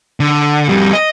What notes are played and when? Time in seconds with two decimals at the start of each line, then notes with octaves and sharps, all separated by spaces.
0.20 D3
0.68 F2 G3
0.93 D#5